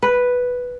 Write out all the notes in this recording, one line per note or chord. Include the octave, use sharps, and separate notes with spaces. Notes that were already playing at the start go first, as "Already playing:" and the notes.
B4